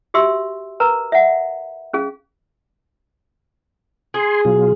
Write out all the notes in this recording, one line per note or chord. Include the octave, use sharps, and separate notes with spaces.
F#4 G4 E5 C6 E6
A#4 B4 A#5
E5 F#5
C#4 G#4 F5
G#4 G#5 C6
B2 F#3 F4